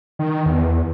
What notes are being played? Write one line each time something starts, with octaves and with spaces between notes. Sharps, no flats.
D#3
E2